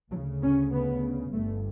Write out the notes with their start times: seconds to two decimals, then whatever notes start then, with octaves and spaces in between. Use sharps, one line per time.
0.11 D2 C#3 F#3
0.42 C#4
0.72 B3
1.33 G1 G2 A3